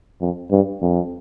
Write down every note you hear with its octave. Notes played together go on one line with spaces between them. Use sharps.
F2
G2
F2